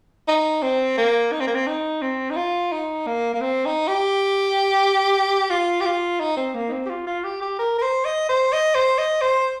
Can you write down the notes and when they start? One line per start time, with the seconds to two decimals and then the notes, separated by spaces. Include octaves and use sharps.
0.28 D#4
0.62 C4
0.98 A#3
1.32 D#4
1.40 C4
1.47 A#3
1.55 C4
1.67 D#4
2.02 C4
2.30 D#4
2.37 F4
2.72 D#4
3.07 A#3
3.34 A#3
3.41 C4
3.65 D#4
3.88 G4
5.50 F4
5.80 G4
5.86 F4
6.20 D#4
6.37 C4
6.55 A#3
6.69 D#4
6.72 C4
6.86 G4
6.90 F4
7.07 F4
7.24 G4
7.42 G4
7.59 A#4
7.78 A#4
7.82 C5
8.05 D#5
8.29 C5
8.53 D#5
8.75 C5
8.98 D#5
9.22 C5